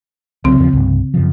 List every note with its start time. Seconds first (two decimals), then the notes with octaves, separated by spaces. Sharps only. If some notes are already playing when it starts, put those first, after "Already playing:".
0.44 C2 C#3 F#3 C4
0.60 D#2 F3
0.73 C2 G2
1.14 F#2 C#3 F3